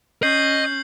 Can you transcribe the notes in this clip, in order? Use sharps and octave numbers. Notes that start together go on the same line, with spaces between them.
C#4 D#5 G6 C7 F#7